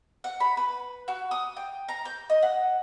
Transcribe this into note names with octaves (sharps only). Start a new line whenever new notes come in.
F#5
B5
B4
F#4
D#6
G5
A#5
G6
D#5
F#5